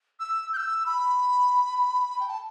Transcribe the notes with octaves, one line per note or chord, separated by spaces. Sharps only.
E6
G6
E6
B5
G5
A5